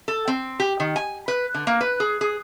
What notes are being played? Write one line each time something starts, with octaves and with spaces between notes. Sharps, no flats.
A4
C4
G4
D#3
G#5
B4
D3
A#3
B4
G#4
G#4